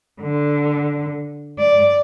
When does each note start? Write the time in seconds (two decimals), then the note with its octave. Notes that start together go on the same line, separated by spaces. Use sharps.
0.21 D3
1.59 D5